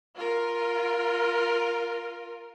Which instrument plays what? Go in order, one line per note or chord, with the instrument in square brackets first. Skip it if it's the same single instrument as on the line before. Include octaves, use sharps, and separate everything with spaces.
[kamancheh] F4 A#4